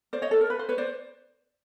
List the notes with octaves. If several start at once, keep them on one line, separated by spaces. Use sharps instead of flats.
C5 D5
C#5 D#5
A4
A#4
B4
C5
B4 C#5
C5 D5